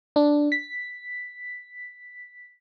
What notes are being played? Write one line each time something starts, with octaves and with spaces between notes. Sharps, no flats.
D4
B6